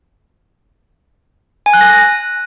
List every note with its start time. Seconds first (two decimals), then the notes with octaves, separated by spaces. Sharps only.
1.66 G#5
1.73 F#6
1.81 A#6